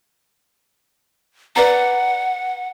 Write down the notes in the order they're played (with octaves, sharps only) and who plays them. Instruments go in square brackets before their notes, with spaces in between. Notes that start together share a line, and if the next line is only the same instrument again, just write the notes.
[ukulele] B4 D5 A#5 [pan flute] F#5